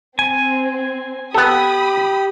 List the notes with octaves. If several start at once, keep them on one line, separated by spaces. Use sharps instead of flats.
C4 G#5
B3 G4 A4 B5 D#6